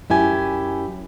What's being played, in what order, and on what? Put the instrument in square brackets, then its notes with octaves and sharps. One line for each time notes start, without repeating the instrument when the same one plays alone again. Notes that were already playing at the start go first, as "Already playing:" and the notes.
[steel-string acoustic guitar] F#2 E4 G4 G#5